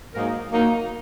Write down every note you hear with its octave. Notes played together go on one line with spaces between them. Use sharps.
G#2 F#3 A#3 D#4 A#4
F#3 A#3 D#4 A#4